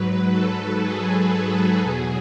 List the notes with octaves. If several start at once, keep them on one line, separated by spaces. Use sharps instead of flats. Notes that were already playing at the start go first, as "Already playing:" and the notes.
Already playing: G#2 F#3 B4
A4
G#4
G#4
E2 B2 F#3